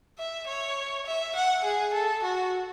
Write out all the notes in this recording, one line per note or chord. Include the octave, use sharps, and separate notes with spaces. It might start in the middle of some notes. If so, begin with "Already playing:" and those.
E5
C#5
E5
F#5
G#4
A4
F#4